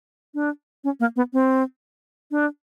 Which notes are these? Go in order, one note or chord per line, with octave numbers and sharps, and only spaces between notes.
D4
C#4
A#3
B3
C4
D4